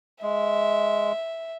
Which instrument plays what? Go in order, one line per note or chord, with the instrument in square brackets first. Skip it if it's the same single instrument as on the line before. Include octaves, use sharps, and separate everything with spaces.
[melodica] G#3 [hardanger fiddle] E5